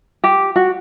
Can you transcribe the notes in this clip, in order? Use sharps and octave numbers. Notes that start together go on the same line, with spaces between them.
G4
F#4